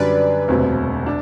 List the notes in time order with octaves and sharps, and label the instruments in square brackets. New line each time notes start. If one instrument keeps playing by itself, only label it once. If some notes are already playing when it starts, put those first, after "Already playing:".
Already playing: [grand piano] F#2 D3 G3 [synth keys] B4 D5
[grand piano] E1 D2 C3 F#3 C4
D4